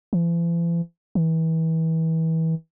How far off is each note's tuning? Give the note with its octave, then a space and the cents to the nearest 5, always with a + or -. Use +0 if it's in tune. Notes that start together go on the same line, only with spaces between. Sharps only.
E3 +45
E3 -30